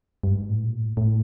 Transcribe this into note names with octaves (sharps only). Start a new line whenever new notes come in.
G2
G#2
A2
A#2
A2
A2